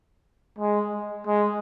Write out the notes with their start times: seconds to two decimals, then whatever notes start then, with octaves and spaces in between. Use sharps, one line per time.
0.59 G#3
1.26 G#3